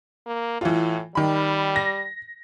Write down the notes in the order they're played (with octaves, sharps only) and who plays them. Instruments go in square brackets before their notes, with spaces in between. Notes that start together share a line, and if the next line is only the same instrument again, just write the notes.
[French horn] A#3
[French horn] A2 [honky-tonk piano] E3 F4
[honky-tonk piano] D#3 B5 [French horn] G3
[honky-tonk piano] A#6